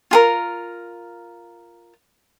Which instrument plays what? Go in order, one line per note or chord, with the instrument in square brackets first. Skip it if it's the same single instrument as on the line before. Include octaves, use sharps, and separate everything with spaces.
[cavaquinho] F4 G#4 A#4